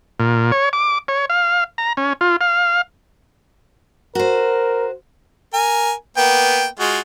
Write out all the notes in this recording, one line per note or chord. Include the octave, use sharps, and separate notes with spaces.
A#2
C#5
D6
C#5
F5
A#5
C#4
F4
F5
F#4 A#4 C5
A#4 G#5
A#3 B3 G5
G#3 F4 F#4